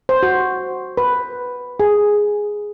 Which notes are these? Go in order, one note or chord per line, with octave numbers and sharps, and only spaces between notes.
C5
F#4
B4
G#4